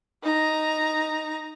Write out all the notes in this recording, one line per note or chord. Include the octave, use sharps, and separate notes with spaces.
D#4 A#5